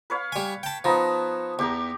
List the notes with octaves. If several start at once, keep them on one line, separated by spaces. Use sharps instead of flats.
B4 C#5 F5
G3 G#5
G5 A5
F3 B3 D#4 A5
E2 G4 G5 A#5